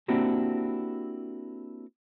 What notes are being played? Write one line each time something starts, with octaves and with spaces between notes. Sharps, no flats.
A#3 C4 D4 E4 F#4 G4